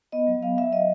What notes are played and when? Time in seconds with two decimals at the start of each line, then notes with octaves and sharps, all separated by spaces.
0.12 B3 D#5
0.27 F#3
0.43 B3 F5
0.57 F#3 E5
0.72 F#3 D#5